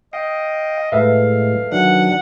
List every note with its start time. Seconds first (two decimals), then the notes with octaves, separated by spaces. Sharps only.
0.13 D#5 F5 G5
0.92 A2 G#3 A4 B4 E5 F5
1.72 D#3 F#3 D4 F#5